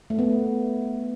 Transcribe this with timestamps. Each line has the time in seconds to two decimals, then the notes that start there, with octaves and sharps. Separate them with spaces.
0.10 A3
0.19 B3